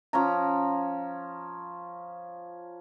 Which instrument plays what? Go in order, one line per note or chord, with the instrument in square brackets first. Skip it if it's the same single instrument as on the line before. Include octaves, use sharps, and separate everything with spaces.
[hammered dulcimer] F3 C#4 A#5